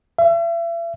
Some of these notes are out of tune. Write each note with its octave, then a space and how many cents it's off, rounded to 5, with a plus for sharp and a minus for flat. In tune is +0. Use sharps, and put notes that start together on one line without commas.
E5 +40